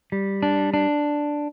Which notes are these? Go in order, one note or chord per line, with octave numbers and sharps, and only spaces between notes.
G3
D4
D4